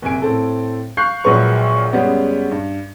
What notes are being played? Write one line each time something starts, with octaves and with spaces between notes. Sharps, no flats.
F#1 C3 G#5 D7
A2 C4 A4
F5 C#6 F#6 G6 C7
A#1 A#2 F#3 G#3 B4 C#6
F#2 C#3 G3 G#3 B3 C#4
G2